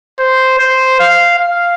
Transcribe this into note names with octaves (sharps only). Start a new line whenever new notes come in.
C5
C5
F5
F5